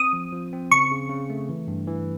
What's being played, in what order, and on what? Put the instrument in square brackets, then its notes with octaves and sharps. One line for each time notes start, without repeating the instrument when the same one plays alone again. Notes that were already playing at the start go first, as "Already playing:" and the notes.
Already playing: [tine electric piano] C4 [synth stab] D#6
[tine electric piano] F3
F3
C4
[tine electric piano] C#3 [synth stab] C#6
[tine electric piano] C#3
C#3
A3
E3
G2
E3